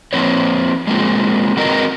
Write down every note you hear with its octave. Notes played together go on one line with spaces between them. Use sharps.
F3 A#3 C4 B4 C#5
G#3 A#3 C4 F4 G#4
D#3 F#3 C4 A#4 B4 D#5